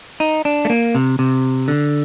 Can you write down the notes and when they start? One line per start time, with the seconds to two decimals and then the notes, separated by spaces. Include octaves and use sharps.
0.20 D#4
0.45 D4
0.65 A3
0.70 A#3
0.95 C3
1.19 C3
1.68 D3